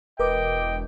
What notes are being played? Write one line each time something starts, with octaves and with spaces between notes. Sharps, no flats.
E1 A#4 B4 D#5 G5 D6